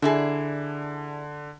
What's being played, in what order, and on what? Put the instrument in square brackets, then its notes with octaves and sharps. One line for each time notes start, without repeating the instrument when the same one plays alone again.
[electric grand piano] D3 [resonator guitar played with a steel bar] D4 E4 G#4